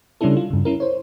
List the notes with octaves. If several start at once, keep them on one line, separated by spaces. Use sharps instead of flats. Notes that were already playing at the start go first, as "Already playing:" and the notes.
C#3 G3 C#4 D4 E4 A4
F4
G2 C#3
C#4 E4 A#4
C5 C#5